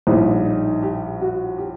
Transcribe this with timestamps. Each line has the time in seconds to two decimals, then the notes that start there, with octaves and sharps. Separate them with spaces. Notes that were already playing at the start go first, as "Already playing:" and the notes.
0.07 A#1 A2 G3 D#4
0.45 D#4
0.83 G4
1.21 F#4
1.58 G4